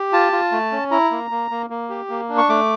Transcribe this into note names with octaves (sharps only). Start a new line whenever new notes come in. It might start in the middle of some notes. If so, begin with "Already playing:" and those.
Already playing: G4
F4 A5
F4
A3
C#4
E4 A#5
A#3
A#3
A#3
A#3
G4
A#3
D4
C#6
A3 D6